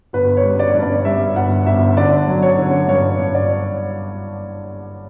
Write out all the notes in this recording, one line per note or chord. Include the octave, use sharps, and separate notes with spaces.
G1 B4
C#5
G3
D5
G2
D5
G3 E5
G1 F#5
G1 E5
D3 D5
F#3
C#5
D3
G2 C#5
G2
D5